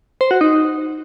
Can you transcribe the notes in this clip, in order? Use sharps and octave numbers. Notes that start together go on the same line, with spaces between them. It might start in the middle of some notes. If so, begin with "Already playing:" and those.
C5
F#4
D#4